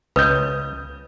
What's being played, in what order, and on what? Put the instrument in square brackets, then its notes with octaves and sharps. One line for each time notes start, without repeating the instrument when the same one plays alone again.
[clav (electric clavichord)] C#2 [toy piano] B4 [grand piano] D#6 G6